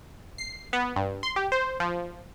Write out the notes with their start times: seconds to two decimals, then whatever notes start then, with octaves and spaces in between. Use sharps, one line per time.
0.38 C7
0.73 B3
0.96 G2
1.23 C6
1.36 G4
1.52 C5
1.80 F3